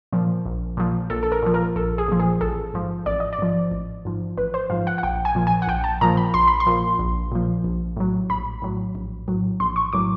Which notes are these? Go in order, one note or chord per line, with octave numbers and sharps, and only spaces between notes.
A#2 F3
A#1
A#2 F3
A#1 A4
A4
A#4
A#2 F3
A#4
A#1 A4
G#4
A#2 F3
G#4
A1 A4
G#2 F3
A1 D5
D#5
D5
G#2 F3
A1
G#2 F3
A1 B4
C5
G#2 F3 F5
F#5
F#5
A#1 G5
G#5
A#2 F3
G#5
F#5
A#1 G5
A5
A#2 F3 A#5
B5
A#1 C6
B5
C6
A#2 F3
A#1
A#2 F3
A#1
A2 F#3
A#1 B5
A2 F#3
A#1
A2 F#3
A#1 C6
C#6
A2 F#3 D6